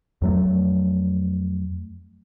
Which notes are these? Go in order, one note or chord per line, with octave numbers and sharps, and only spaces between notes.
F2 F#3 A3